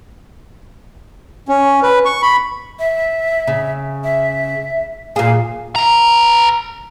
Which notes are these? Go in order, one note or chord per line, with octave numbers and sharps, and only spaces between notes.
C#4
B4
C#6
B5
E5
C#3
E5
A#2 G#4 F5
B4 A#5